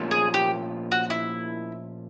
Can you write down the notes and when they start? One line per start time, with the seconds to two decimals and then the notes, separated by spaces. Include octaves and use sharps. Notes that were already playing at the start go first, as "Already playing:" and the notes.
Already playing: A#2 F3 A#3 C#4 F4
0.11 G#4
0.34 G4
0.92 F#4
1.10 E4